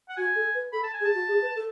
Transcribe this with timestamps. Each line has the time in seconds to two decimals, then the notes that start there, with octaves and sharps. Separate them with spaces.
0.09 F#5
0.17 F#4 G#5
0.35 A4
0.55 B4
0.72 A4 B5
0.83 A5
0.93 G#5
1.01 G#4
1.05 A5
1.14 F#4
1.28 G#4
1.42 B4
1.56 A4